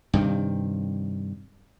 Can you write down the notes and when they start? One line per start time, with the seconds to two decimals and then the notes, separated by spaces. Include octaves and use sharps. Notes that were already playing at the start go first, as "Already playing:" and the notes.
0.14 G2 C3 D#3